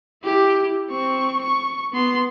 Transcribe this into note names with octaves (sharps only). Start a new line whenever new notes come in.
E4 G4
C4 C#6
C#6
B3 C6